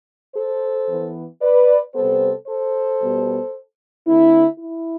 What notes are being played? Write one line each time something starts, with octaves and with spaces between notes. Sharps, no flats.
A4 C5
E3 B3
B4 D5
C3 G3 B3 A4 C5
A4 C5
B2 G3 B3
D3 A3 C4 E4
E4